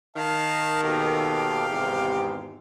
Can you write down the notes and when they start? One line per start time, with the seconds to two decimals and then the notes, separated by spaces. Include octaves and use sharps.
0.16 D#3 F5 A5
0.83 D#2 B2 G4 A4 F5
1.70 G#1 E2 G#2 C3